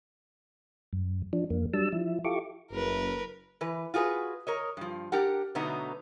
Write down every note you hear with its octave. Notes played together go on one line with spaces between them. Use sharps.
F#2
F3 D4
F2 A#3
F#3 G3 D4 A5 E6
F3 E4
E4 F4 G4 A4 C#6 D6
F#1 A#4 B4
E3 B4
F4 F#4 G#4 A4 B4
A#4 C#5 D#5
G2 F3
D4 G4 A#4 F#5
B2 D3 F#3 A3 B3 D#4